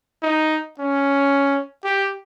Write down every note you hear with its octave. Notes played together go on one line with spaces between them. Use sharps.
D#4
C#4
G4